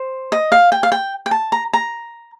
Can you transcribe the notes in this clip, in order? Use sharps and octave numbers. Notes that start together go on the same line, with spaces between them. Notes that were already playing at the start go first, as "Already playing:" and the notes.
Already playing: C5
D#5
F5
G5
F5
G5
G5
A5
A#5
A#5